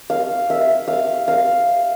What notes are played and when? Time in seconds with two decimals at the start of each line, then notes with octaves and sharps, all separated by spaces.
0.10 F5
0.50 E5
0.88 F5
1.28 F5